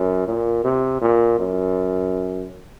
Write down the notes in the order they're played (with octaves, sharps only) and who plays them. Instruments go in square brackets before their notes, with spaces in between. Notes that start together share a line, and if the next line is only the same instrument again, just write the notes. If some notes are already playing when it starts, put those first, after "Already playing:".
Already playing: [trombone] F#2
A#2
C3
A#2
F#2